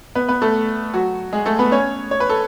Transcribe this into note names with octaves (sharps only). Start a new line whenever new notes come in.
B3 B4
B3 B4
A3 A4
F#3 F#4
G#3 G#4
A3 A4
B3 B4
C#4 C#5
C#5
B4
A4